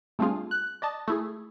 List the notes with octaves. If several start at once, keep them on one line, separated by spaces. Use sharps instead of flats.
G3 A3 C4 D4 F4 G#4
F#6
D5 D#5 A5
A3 E4 G#4